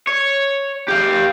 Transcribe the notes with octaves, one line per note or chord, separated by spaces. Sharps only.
C#5
G4 F5